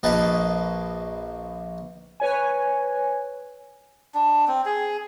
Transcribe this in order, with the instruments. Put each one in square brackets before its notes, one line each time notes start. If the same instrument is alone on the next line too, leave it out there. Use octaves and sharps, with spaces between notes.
[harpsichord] A#1 A#3 B4 D#5 A5
[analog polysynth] B4 C#5 G#5
[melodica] D4
C4
G#4